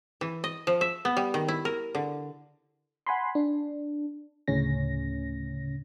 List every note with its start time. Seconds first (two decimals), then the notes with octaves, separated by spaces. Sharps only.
0.21 E3
0.44 D#5
0.67 F3
0.81 E5
1.05 B3
1.17 G3
1.34 D#3
1.48 E4
1.65 A#4
1.95 D3
3.07 F#5 G#5 B5 C6
3.35 D4
4.48 D2 A2 C#3 C#4 A#6